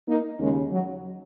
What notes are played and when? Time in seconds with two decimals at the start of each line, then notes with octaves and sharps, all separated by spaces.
0.08 A#3 D#4
0.39 D#2 C#3 G#3 C#4
0.71 F#3